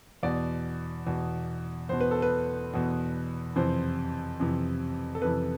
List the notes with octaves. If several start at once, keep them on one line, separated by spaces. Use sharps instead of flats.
E2 B2 D5
E2 B2
E2 B2 C5
B4
A4
B4
E2 B2
F2 C3 E3 C5
F2 C3 E3
A4
F2 C3 E3 B4